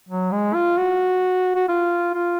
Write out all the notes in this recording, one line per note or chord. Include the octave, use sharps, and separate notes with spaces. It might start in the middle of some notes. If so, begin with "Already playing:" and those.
F#3
G#3
F4
F#4
F#4
F4
F4